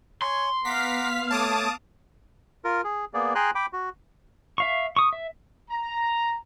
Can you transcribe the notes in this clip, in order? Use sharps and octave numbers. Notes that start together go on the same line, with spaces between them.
C#5 G#5 C6 C#6
B3 F5 F#5 A#5 D6 B6
A3 C#5 A5 D6 D#6
F4 A#4
G#4
A#3 B3 G#4 D5
G#4 G5 G#5 A#5 C6 F#6
G5 B5 D6
F#4
E5 F5 C#6
C#6 D#6
E5
A#5